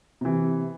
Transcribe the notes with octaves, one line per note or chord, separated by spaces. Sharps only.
C3 E3